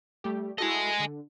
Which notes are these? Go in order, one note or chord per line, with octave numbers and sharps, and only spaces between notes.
G3 A3 G4
E4 F#4 A4 D#5 G#5
D3